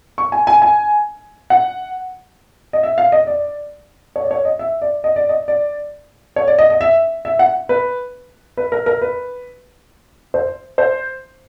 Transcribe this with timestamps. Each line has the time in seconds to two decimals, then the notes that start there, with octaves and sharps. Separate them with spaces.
0.18 C#6
0.32 G#5
0.47 G#5
0.62 G#5
1.50 F#5
2.73 D#5
2.83 E5
2.98 F5
3.12 D#5
3.27 D5
4.16 C#5
4.24 D5
4.31 C#5
4.45 D#5
4.59 E5
4.82 D5
5.04 D#5
5.16 D5
5.29 D#5
5.48 D5
6.36 C#5
6.48 D5
6.59 D#5
6.70 D#5
6.81 E5
7.25 E5
7.39 F#5
7.69 B4
8.57 B4
8.72 A#4
8.86 A#4
9.02 B4
10.34 C5
10.78 C5